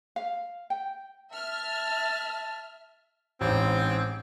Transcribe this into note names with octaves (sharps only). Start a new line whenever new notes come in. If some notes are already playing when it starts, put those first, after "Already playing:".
F5
G5
E5 A5 F6
A1 G#2 C4